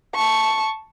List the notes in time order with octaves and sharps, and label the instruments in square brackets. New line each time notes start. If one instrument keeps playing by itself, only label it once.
[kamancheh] A5 C#6